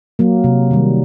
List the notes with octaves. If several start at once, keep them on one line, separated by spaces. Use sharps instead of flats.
F#3 A#3
C3
D#3 G3